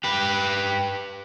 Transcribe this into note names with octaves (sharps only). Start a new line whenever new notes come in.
G4 B4